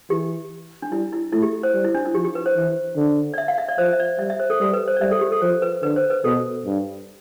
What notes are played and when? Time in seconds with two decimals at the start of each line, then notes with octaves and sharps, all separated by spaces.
0.10 E3 G4
0.82 D4
0.91 G3 E4
1.13 E4
1.33 A3 E4
1.43 G4
1.63 C5
1.74 G3
1.84 E4
1.95 D4
2.05 E4
2.14 F3 G4
2.25 G4
2.35 B4
2.46 C5
2.56 E3
2.96 D3
3.34 D5
3.38 E5
3.48 F5
3.58 E5
3.68 D5
3.78 F3 C5
3.93 E5
4.00 D5
4.19 G3 E5
4.30 E5
4.40 C5
4.50 A4
4.60 G3 A4
4.73 B4
4.88 C5
4.97 D5
5.01 G3 E5
5.11 A4
5.21 G4
5.32 A4
5.42 F3 C5
5.62 B4
5.83 D3 B4
5.96 C5
6.10 B4
6.24 B2 A4
6.66 G2